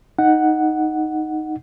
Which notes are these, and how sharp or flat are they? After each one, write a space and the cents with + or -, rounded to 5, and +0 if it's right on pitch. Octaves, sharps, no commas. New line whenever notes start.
D#4 +0 F#5 +0